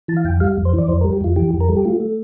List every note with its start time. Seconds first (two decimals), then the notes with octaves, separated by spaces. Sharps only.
0.08 E3 A5
0.17 F5
0.24 F2 G5
0.40 G3 F5
0.57 F2
0.65 C5
0.73 E3 D5
0.88 F2 C5
1.01 A#4
1.04 G3
1.13 G4
1.21 F2 F4
1.36 E3 G4
1.53 F2
1.61 A#4
1.68 G3 A4
1.77 G4
1.85 A3 F4
2.00 A3